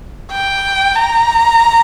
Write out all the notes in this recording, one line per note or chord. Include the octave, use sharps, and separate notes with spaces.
G5
A#5